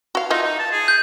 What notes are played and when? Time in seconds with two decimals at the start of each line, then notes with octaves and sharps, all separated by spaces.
0.15 F#4 F5
0.30 D#4 F4 D#5 E5
0.42 D#4
0.59 A5
0.72 G#4
0.88 G6